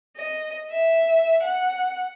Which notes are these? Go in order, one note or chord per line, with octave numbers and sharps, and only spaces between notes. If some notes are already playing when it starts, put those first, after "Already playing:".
D#5
E5
F#5